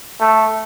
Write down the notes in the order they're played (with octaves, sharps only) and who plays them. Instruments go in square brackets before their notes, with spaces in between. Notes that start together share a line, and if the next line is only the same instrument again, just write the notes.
[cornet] A3